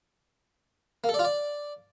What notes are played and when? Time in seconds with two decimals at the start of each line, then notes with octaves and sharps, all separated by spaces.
1.04 A#3
1.09 A4
1.14 D5
1.19 F4
1.24 D5